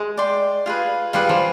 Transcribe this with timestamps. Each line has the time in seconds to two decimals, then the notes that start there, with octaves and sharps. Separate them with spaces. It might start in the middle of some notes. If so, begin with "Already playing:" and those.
Already playing: G#3
0.17 D5 G5 C6
0.66 F4 G#4 B4
1.13 G3 F4 G#4 B4
1.29 F3